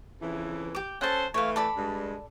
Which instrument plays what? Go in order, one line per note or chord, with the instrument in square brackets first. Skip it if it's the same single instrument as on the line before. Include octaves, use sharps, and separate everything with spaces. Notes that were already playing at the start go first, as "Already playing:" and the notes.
[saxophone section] F2 C#3 E3
[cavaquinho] G4 D6
[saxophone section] C#4 A4 C5 [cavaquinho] F#5 A5
[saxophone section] E3 A3 [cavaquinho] C#5 F5
[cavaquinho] A4 D5 B5
[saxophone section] G2 G#3